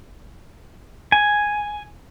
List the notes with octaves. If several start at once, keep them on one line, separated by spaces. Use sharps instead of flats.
G#5